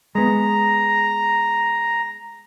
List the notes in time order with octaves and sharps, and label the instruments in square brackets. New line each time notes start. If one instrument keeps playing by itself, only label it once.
[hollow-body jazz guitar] G#3 B3 [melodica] A#5